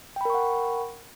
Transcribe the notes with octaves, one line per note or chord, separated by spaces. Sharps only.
A#4 F#5 G5 B5 C#6